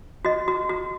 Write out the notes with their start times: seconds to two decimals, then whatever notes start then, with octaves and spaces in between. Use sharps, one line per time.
0.25 F#4 D#5
0.48 F#4
0.69 F#4